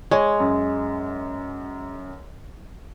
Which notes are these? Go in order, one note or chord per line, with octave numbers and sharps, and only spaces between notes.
G#3 C#5
F#2